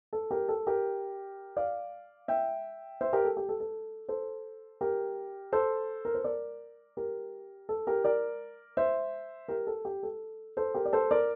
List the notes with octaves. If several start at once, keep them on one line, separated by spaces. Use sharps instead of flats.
A4
G4 A#4
A4
G4 A#4
D5 F5
E5 G5
C5 E5
G4 A#4
A4
G4
A4
A4
A4 C5
G4 A#4
A4 C5
A#4
C5
A#4 D5
G4 A#4
A4
G4 A#4
A#4 D5
C5 E5
G4 A#4
A4
G4
A4
A4 C5
G4 A#4
D5
A4 C5
A#4 D5